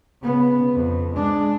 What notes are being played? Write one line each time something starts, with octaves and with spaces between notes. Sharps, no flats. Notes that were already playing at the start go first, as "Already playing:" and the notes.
C#3 B3
F2
G#3 D4